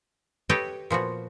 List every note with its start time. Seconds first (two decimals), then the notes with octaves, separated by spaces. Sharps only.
0.49 G4 A4 B4 C#5 D#5 G5
0.90 A#2 F3 B3 F#4